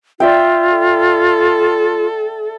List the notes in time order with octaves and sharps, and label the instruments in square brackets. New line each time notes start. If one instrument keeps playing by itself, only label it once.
[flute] F4 [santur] D5 E5 G5
[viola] A4